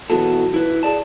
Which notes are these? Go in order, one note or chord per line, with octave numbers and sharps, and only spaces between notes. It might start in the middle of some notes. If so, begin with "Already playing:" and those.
B2 E3 F#3 B3 F#4 A4
E4 B4
G#4 D5 A5